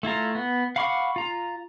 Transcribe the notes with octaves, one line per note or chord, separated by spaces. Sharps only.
A3 E4 F4 A#5
B3
F5 F#5 B5 C#6 D6
F4 A#5